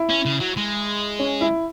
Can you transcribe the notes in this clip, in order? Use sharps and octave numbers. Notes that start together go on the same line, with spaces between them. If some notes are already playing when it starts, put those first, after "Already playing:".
Already playing: E4
C#4
C#3
F#3
G#3
C#4
E4